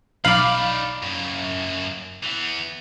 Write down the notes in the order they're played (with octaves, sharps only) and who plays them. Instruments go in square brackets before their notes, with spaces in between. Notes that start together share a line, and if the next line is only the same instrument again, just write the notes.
[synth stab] B1 F5 [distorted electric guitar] D#4 D5 [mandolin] B5 D6
[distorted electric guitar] F#2 A#3
E3 B3